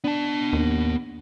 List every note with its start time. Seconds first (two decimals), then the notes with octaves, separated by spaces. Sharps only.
0.04 B3 D4 A5
0.53 D#2